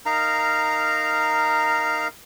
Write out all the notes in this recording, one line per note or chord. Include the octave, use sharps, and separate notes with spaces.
D#4 A#4 F5 A#5